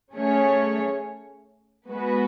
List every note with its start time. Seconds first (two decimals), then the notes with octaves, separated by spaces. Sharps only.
0.14 A3 C#4 G#4 C#5
1.90 G#3 B3 F#4 B4